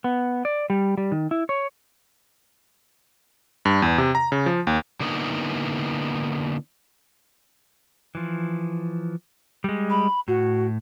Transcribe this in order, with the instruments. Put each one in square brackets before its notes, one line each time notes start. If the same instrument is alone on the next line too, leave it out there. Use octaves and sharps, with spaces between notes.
[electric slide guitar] B3
D5
G3
G3
D#3
E4
C#5
[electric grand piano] G2
E2
C3
A#5
C#3
F3
D#2
[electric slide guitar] D3 A#3 B3 C#4 D#4 E4
E3 F3
G3 G#3
[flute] B5
[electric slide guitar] A2 [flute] F#4